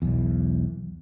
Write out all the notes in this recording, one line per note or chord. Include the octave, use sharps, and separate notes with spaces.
B1 E2